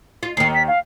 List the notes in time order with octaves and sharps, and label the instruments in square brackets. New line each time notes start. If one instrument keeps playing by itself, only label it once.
[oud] F4
[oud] D#2 D#3 [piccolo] C7
[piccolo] B6
F5